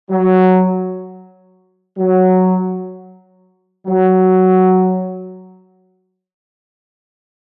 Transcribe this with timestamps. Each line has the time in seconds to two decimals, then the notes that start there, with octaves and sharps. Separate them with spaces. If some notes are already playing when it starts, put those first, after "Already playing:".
0.11 F#3
1.98 F#3
3.87 F#3